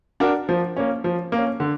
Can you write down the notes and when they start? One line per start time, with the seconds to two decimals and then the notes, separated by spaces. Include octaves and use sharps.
0.20 D4 F#4 A#4
0.49 F3
0.76 A#3 C#4
1.04 F3
1.32 A#3 C#4
1.60 D3